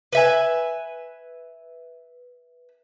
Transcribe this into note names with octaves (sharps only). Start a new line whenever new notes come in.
B4 E5 G#5